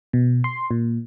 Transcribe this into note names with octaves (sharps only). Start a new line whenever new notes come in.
B2
C6
A#2